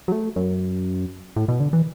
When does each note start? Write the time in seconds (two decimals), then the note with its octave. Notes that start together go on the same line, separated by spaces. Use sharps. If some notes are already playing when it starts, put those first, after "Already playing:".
0.08 F#3
0.12 A3
0.36 F#2
1.36 A2
1.48 B2
1.60 D3
1.73 E3